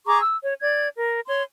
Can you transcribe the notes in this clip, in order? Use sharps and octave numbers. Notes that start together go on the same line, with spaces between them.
G#4 A#5 C#6 D6
E6
C#5
D5 G#6
A#4
C#5 C6